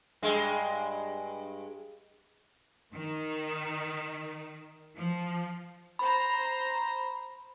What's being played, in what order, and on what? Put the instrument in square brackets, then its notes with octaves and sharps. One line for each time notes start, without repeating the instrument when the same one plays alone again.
[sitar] G2 G#3
[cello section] D#3
F3
[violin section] C5 A#5 [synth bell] B5